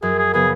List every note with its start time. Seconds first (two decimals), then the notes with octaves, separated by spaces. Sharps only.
0.02 F#2 G#4
0.19 G#4
0.34 C#3 F#3 B3 G#4